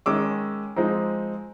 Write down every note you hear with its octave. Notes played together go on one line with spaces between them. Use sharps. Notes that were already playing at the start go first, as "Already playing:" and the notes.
D#3 G#3 C#4 D6 E6
F3 G#3 C4 D#4